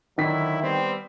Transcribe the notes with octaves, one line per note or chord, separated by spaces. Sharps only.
D3 D#3 F#3 E4 B6
G3 B3 C4